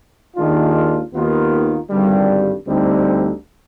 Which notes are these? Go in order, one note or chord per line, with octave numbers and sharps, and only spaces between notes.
D#2 D#3 G#3 D4 F4
D#2 D#3 B3 F4
G#1 G2 D3 G3
D2 D3 G3 C4 D#4